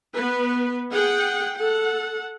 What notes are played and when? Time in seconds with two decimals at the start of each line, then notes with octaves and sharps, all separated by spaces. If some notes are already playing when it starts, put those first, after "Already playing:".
0.15 B3 B4
0.91 G#4 F#5 G5
1.55 A4 F#5